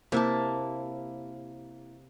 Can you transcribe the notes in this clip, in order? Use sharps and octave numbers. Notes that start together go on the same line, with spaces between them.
C3 A#3 E4 A5